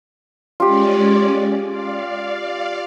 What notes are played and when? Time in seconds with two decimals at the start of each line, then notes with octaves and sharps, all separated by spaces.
0.60 G#3 C#4 F4 G4 D5
1.68 D5 F5